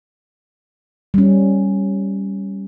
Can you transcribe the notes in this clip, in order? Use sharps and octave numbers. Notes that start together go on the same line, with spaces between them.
G3 C#4